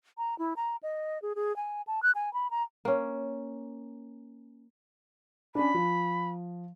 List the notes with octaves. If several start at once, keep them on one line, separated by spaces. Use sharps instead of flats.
A#5
E4
A#5
D#5
G#4
G#4
G#5
A5
F#6
G#5
B5
A#5
A#3 C#4
C#4 D4 B5
F3